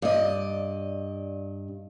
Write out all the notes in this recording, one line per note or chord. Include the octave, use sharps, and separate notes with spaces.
G2 D5 D#5